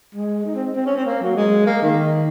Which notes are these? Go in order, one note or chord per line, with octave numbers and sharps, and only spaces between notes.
G#3
D#4
C4
C4
C#4
C4
A#3
F#3
G#3
A#3
D#3